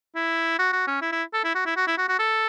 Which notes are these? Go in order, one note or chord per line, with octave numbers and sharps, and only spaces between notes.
E4
F#4
F#4
C#4
E4
E4
A4
E4
F#4
E4
F#4
E4
F#4
F#4
A4